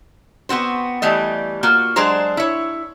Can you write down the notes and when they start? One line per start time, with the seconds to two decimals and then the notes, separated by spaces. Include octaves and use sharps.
0.49 B3 C4 F#4 C5
1.02 E3 G3 A3 D#5
1.63 A#3 F4 F#4
1.96 F#3 G#3 D4 G#4 C5 A#5
2.37 E4 C#5